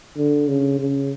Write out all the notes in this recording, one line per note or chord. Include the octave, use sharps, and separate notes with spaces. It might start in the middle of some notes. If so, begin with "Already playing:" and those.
D3
C#3
C#3